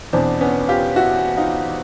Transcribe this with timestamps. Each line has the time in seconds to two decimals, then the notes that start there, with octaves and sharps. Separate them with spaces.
0.13 E2 B2 C4 D4
0.41 B3 C#4
0.69 F4 G4
0.96 E4 F#4
1.37 D#4 F4